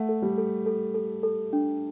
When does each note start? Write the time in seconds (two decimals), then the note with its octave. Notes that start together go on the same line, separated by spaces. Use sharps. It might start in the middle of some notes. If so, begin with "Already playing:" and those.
Already playing: A3 F#5
0.09 A4
0.22 G3
0.38 A4
0.66 A4
0.95 A4
1.23 A4
1.53 D4